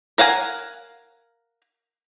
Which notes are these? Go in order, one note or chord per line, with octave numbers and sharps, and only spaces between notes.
A#4 F5 F#5 G#5